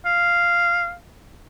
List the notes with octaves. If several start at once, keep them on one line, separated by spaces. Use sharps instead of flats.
F5